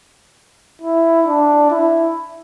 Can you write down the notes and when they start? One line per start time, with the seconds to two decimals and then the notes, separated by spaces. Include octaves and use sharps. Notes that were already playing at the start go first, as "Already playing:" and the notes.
0.82 E4
1.27 D4
1.70 E4